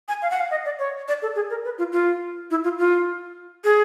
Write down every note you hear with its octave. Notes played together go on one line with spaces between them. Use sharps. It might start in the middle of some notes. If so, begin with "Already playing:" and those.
G#5
F5
F#5
F5
D#5
D5
C#5
D5
A4
G#4
A#4
B4
F4
F4
E4
F4
F4
G#4